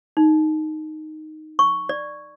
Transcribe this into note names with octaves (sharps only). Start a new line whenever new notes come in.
D#4
C#6
D5